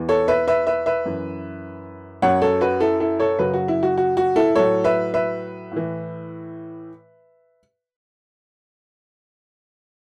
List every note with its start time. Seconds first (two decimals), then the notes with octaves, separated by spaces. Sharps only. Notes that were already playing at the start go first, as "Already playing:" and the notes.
Already playing: E2 E3
0.09 A4 C#5
0.28 B4 E5
0.47 B4 E5
0.67 B4 E5
0.86 B4 E5
1.05 F#2 E3
2.22 F#2 F#3 C#5 F#5
2.42 A4 C#5
2.61 F#4 B4
2.80 E4 A4
3.00 E4 A4
3.19 A4 C#5
3.39 F#2 C#3 F#3 F#4 B4
3.54 F#4
3.68 E4
3.83 F#4
3.98 F#4
4.17 F#4
4.36 E4 A4
4.55 A2 F#3 A4 C#5
4.84 B4 E5
5.14 B4 E5
5.72 A2 E3